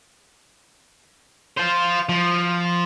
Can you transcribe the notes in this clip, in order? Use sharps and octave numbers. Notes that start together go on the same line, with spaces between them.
F4 C5
F3